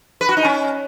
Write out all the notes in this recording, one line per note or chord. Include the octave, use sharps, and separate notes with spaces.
B4
F#4
D#4
C#4